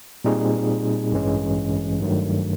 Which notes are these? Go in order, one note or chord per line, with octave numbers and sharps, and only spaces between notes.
A#2 G3 C4 D#4 G#4
A1 G2 E3 G#3 C#4
G2 D#3 F#3 A3